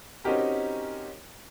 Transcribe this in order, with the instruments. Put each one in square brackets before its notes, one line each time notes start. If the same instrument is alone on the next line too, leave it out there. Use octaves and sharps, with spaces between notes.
[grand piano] C4 C#4 D#4 F#4 G4 A#4